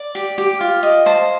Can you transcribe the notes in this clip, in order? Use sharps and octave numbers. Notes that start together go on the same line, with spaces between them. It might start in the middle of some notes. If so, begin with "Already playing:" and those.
Already playing: D5
G4
G4
F4
D#5
C5 A5